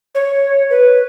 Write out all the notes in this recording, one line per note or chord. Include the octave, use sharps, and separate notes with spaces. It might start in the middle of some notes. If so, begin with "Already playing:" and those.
C#5
B4